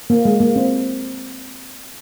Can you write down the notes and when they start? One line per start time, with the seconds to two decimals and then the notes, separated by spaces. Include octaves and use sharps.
0.10 A#3
0.25 G#3
0.41 A#3
0.56 C4